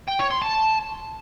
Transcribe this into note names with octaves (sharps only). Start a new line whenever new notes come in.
G5
C#5
C6
A5